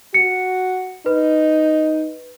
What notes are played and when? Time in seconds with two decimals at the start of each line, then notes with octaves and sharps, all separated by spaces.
0.14 F#4 C#7
1.06 D#4 B4